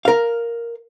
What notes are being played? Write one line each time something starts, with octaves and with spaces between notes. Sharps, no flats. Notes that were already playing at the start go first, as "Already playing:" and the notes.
A#4 F5